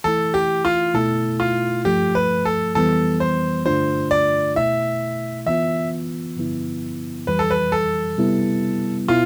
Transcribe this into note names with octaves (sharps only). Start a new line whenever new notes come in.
E3 A3 E4 A4
G4
F4
B2 A3 E4 A4
F4
G2 F3 A3 G4
B4
A4
F2 E3 G3 B3 A4
C5
G2 D3 A3 D4 F4 C5
D5
B2 A3 E4 E5
E3 B3 F4 E5
G2 D3 F3 B3 E4
F2 E3 G3 B4
A4
B4
A4
C3 G3 B3 E4
B2 B3 E4 F4